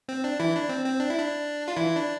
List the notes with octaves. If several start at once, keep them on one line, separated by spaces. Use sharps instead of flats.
C4
D4
E3 E4
D4
C4
C4
D4
E4
D4
F4
E3 E4
D4